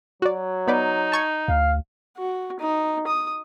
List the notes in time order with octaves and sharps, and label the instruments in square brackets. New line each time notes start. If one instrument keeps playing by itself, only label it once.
[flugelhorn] F#3 [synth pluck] F#4 D5
[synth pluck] B3 B4 D5 [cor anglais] D#4
[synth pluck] A5 C#6 G#6
[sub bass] D2 [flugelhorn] F5
[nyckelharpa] F#4
D#4
D#6